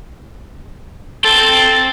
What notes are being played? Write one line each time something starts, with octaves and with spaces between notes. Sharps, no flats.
C4 A4 G5